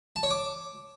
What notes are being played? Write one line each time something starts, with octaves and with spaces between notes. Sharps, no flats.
A5
C#5
D6